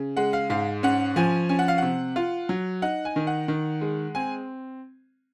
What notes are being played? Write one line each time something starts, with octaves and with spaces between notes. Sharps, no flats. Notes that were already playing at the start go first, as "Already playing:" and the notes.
Already playing: C#3
G#3 F#5
F5
G#2 F5
C#4 F#5
F3 G#5
C#4 G#5
F#5
F5
C3 F#5
F4
F#3
D#4 F#5
G#5
D#3
F#5
D#3
G#3
C4 G#5